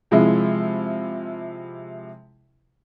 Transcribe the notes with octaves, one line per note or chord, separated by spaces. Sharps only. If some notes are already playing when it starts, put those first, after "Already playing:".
C3 F3 G#3 E4